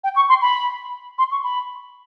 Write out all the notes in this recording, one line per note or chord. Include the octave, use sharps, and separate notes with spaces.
G5
C#6
C6
B5
C6
C#6
B5